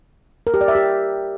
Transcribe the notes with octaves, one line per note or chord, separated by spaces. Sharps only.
A#4
G4
D5
E5
G4